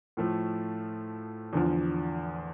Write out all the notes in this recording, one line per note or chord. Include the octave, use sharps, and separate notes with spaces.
A2 F3 A3
E2 D3 F3